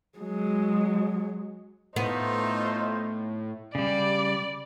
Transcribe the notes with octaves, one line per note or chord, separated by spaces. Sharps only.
F#3 G#3
A2 A3 B3 D#4 F4 C5
C#3 G3 D5